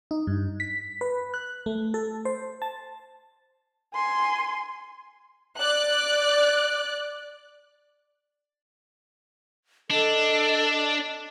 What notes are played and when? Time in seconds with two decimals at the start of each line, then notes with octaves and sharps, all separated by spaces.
0.11 D#4
0.27 G2
0.60 B6
1.01 B4
1.34 F#6
1.66 A3
1.94 A4
2.25 C5
2.62 A5
3.95 G#5 C6
5.59 D5 F#6
9.91 D4 A4 D#5